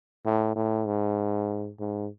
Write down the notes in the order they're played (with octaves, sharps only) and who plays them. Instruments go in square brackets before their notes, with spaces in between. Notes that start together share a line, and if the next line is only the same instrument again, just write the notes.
[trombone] A2
A2
G#2
G#2